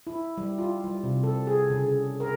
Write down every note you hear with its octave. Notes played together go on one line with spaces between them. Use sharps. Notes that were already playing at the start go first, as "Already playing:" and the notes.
E4
G3
F4
G3
C3
A4
G#4
C#3
A#4